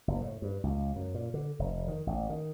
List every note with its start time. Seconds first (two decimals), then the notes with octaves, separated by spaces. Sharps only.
0.08 F#1
0.21 A2
0.42 G2
0.64 C#2
0.96 F#2
1.14 A#2
1.34 D3
1.59 F1
1.88 D#3
2.07 A1
2.30 D#3